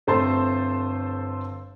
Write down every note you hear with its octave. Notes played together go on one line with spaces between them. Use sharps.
G1 A3 C4 C5 A5 C6